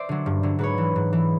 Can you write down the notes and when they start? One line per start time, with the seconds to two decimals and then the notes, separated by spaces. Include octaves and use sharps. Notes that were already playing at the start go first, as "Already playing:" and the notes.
Already playing: C5 D5 E5
0.09 D3 F#3
0.26 G2
0.43 D3 F#3
0.59 G#2 B4 C#5
0.78 E3
0.96 G#2
1.13 E3